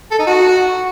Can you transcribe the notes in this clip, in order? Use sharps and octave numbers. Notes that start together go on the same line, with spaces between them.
A4
D#4
F#4